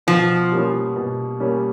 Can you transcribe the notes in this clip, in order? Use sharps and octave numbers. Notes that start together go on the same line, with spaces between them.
B2 F3
G3 A#3 C#4
B2
G3 A#3 C#4